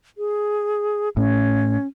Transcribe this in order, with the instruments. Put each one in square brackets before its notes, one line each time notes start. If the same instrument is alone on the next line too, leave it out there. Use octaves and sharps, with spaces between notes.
[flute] G#4
[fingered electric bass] A2 [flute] C#4